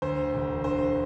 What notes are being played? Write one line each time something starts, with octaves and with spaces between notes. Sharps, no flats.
D2 C5
E1
D3 C5